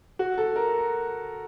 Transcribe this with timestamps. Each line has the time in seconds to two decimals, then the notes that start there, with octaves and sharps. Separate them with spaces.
0.19 F#4
0.38 A4
0.56 A#4